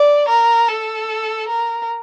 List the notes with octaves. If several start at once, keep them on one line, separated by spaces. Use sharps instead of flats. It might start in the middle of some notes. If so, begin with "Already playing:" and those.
Already playing: D5
A#4
A4
A#4